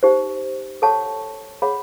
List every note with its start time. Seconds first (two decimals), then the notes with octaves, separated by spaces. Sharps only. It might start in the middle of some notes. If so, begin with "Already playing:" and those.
0.03 D#4 G4 C5
0.82 A4 C#5 F#5 A5 C#6
1.62 G#4 C#5 F#5 B5